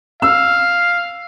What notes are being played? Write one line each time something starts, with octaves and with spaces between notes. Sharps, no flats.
F5 E6